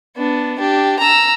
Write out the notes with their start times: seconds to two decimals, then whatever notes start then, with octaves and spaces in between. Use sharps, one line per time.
0.17 B3 D4
0.58 D4 G4
0.99 A#5 E6